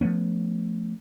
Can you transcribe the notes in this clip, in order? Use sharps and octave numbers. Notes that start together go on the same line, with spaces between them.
F3 A3 B3 C#4